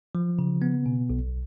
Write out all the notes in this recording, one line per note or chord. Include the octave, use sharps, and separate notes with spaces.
F3
C#3
B3
B2
B1